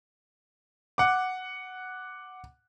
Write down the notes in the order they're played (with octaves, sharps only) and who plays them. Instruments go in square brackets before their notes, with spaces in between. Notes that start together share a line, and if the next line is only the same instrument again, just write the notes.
[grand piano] F#5 D6